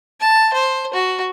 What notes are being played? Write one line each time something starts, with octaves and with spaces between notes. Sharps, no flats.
A5
C5
F#4